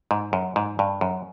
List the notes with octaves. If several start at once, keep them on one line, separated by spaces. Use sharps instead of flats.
G#2
F#2
G#2
G2
F#2